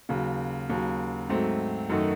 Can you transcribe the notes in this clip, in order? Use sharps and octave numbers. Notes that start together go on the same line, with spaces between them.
D#2 C#3 F#3
D#2 C#3 F#3
G#2 F#3 A3 C4
F#2 D#3 A3 D#4 F#4